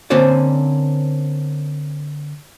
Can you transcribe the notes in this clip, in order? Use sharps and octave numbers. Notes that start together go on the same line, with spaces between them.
D3 A#3 C4 C#4 C5 D5